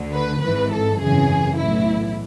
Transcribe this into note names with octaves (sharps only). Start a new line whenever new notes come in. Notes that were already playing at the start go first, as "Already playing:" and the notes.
Already playing: D2 D3
B4
G#1 G#2 E3 B4
A4
G#1 F#2 C#3 E3 G#4
B1 A2 E3 E4